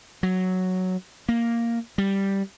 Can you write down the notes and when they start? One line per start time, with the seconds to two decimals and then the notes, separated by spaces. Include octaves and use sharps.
0.23 F#3
1.29 A#3
1.98 G3